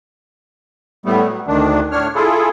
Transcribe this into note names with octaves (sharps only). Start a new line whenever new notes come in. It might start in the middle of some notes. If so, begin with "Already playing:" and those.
A2 G3 A3 B3
F#3
D2 D#3 D4
A2 D4 C#5 F6
E4 F4 G#4 A4